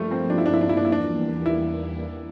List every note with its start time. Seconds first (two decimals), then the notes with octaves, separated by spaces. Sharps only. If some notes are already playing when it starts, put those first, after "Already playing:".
Already playing: G2 F3 G3 A3 A#3 F4
0.11 C4
0.30 D4
0.38 E4
0.46 D4
0.53 E4
0.61 D4
0.69 E4
0.77 D4
0.85 E4
0.88 E2 E3 G3 A#3 D4
1.46 E4